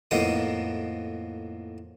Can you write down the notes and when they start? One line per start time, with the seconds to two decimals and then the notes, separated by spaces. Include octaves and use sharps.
0.11 F2 A2 A#3 B3 D#4 D#6